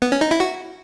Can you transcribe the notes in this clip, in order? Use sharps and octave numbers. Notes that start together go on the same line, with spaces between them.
B3
C#4
D#4
E4
F#4